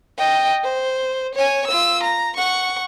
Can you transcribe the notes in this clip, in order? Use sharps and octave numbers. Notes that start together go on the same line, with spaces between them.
D#5 G5
C5
C#5 G#5
F4 E6
A#5
F#5 C#6